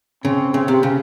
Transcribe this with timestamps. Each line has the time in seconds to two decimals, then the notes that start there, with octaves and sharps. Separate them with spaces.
0.24 C#3 C4
0.54 C#3 C4
0.68 C3
0.83 C#3